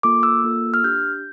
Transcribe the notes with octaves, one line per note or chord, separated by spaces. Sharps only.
A#3 F4 A4 D6
E6
A#3 F4 A4
F6
D4 G4 G6